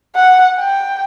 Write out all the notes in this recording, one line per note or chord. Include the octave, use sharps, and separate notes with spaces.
F#5
G5